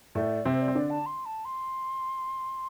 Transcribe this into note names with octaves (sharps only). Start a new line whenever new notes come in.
A2 A3 D5
C3 C4 C5
D5
C4
D3 D4 D5
A5
C6
A5
C6